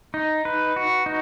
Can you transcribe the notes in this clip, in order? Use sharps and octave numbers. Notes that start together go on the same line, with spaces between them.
D#4
B4
F#4
D#4